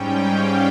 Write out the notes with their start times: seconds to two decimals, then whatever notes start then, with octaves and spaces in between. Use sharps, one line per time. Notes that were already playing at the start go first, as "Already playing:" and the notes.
Already playing: G#2 G3 C#4 G5
0.25 F5